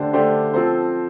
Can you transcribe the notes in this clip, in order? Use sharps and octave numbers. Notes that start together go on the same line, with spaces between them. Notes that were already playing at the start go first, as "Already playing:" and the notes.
Already playing: D3 A3 D4 G4 C5
D3 A3 D4 G4 C5
F3 C4 A4 C5